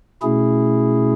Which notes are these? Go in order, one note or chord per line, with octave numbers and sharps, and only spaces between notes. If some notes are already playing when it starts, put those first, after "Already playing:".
B2 A3 C#4 E4 G#4